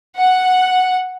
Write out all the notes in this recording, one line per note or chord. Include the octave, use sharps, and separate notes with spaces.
F#5